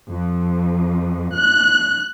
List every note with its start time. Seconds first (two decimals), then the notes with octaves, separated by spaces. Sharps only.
0.11 F2
1.37 F#6